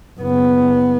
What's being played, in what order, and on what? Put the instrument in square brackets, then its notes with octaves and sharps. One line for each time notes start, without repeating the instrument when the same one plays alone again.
[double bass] F#1 B3